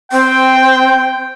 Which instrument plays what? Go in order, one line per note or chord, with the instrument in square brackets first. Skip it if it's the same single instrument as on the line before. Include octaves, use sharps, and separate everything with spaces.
[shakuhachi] C4 [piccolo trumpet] G5